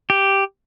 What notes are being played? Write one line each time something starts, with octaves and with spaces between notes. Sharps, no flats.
G4